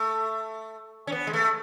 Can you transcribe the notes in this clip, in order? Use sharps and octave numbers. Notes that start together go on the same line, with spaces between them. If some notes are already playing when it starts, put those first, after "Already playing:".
Already playing: A3
C#4
B3
G#3
A3